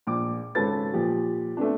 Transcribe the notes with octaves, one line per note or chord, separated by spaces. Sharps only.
A#1 D6
G#1 C#3 C#4 A4 B4 A6
A#2 F3 G4
A3 B3 C4 D4